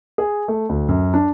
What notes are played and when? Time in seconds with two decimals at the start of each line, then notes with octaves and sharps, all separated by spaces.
0.18 G#4
0.48 A3
0.69 D2
0.89 F#2
1.14 D4